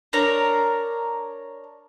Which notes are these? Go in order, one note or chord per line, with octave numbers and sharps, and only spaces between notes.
D4 A#4 C#5 A#5